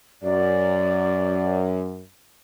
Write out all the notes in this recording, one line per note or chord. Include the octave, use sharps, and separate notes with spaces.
F#2 D5